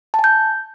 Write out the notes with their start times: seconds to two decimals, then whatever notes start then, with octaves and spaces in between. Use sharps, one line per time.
0.14 A5
0.19 G#5
0.24 G6